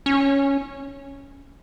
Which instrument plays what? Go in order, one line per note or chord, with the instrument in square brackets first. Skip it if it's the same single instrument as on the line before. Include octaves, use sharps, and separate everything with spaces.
[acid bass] C#4